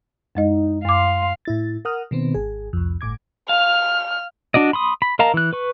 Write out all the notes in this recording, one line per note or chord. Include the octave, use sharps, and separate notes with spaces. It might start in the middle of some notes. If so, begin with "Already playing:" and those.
F#2 G#3 D#4 D#5
F#2 F5 C6 D6
A2 E4 A6
A#4 F#5 D#6 F6
B2 D#3 B3 C4
G#1 G#4
C2 F2
G1 A2 D6 G#6
F5 F6
D4 F#4 D5 D#5
B5 C6 D#6
B5
A#4 D#5 F5 A5 A#5
E3 F#6
B4 C#6